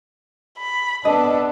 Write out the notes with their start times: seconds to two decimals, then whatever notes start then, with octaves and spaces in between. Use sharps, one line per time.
0.58 B5
1.05 B3 D4 A4 D#5